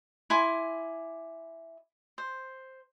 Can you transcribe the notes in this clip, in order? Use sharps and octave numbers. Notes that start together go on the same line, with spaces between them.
E4 G#5 C6 D6
C5